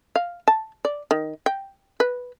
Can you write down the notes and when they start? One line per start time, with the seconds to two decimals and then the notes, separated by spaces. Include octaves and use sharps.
0.16 F5
0.48 A5
0.85 D5
1.11 D#3
1.46 G5
2.00 B4